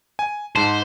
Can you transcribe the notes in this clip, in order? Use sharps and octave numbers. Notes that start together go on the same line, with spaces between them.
G#5
G#2 C5 A5